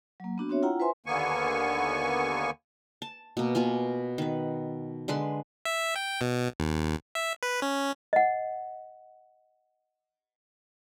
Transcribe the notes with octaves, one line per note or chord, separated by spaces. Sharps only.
F#3 A#3
B3 D4 F#4
C4 D4 F#4 C#5 E5
E4 F4 F#5 G5 A#5
B4 C5 E5 G#5 C6
D#2 D3 A#3 B3 G#5 C#6
A5
B2 A#3
B2 A#3 F4 G#5
D#3 B4
D3 G#3 B4 C6
E5
G5
B2
D#2
E5
B4
C#4
D#5 F#5